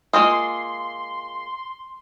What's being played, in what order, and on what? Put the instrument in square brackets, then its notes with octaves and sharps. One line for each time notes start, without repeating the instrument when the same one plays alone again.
[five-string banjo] G#3 A#3 F4 [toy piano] E5 D#6 [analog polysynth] C6